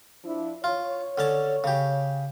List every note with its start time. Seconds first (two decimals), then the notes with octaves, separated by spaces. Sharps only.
0.24 F3 D4 E4
0.64 F4 C#5
1.18 D3 C#4 A5
1.64 C#3 G4